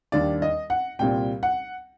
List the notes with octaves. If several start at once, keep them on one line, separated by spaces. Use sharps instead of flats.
D#2 D#3 G3 D4 D5
D#5
F#5
C2 A#2 G3 C4 G5
F#5